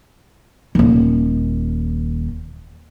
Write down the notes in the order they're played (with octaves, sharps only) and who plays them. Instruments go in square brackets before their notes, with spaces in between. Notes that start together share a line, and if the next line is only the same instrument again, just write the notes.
[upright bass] D#1 D#2